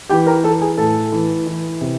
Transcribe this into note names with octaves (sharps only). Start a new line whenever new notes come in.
E3 G4 G5
A#4 A#5
E3 A4 A5
G#4 G#5
A2 A4 A5
E3
E3
C3